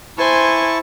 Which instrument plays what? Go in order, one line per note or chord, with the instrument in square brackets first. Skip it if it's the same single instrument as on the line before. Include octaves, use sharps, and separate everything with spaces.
[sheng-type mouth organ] E4 A5 C#6 [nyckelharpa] C5 G#5